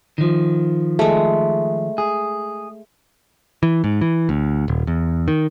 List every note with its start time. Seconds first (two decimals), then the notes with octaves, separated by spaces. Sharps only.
0.18 D#3 F3
0.99 G#3 A3
1.98 G#4
3.63 E3
3.84 G#2
4.01 E3
4.29 D2
4.68 D#1
4.87 E2
5.28 D#3